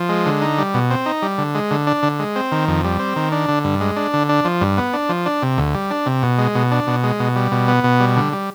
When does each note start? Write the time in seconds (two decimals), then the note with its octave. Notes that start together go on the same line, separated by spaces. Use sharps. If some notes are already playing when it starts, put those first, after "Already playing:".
Already playing: F3
0.09 G#3
0.26 D3
0.42 D#4
0.58 G3
0.74 B2
0.90 C4
1.06 D#4
1.22 G3
1.38 D3
1.55 G#3
1.71 D3
1.87 D4
2.03 D3
2.19 G#3
2.36 C4
2.52 D#3
2.68 F2
2.84 G3
2.99 C4
3.16 D#3
3.32 D4
3.48 D3
3.64 G2
3.80 G#3
3.96 D4
4.13 D3
4.29 D4
4.45 F3
4.61 G2
4.77 B3
4.93 D4
5.09 F3
5.26 D4
5.42 C3
5.58 D2
5.74 G3
5.91 D4
6.06 C3
6.23 B2
6.38 G#3
6.55 B2
6.71 D4
6.87 B2
7.04 G#3
7.20 B2
7.36 G3
7.52 B2
7.68 B3
7.84 B2
8.00 G3
8.16 D3
8.33 G3